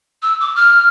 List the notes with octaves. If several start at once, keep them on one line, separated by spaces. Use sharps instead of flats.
E6
D6
F6